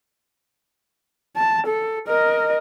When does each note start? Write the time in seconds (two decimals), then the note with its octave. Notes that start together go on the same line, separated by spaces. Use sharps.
1.37 A5
1.67 A4
2.08 A#4 D#5